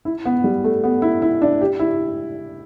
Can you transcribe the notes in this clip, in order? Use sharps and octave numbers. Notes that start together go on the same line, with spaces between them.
E4
B3
G3
A3
B3
E4
E4
D4
G4
E4